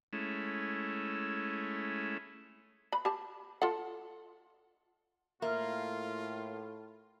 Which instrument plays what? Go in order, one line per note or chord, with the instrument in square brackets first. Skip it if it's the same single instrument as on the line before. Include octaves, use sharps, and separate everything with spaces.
[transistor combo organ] G#3 A3 C#4 E4
[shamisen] B4 B5
G4 A5
F4 A4 F#5
[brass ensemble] A2 [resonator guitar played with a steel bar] A#3 [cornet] F4 [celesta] E5 F6